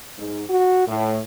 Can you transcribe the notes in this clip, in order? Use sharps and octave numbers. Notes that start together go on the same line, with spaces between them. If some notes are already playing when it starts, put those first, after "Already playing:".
G#2
F#4
A2